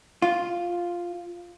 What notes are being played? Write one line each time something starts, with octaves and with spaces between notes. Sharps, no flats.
F4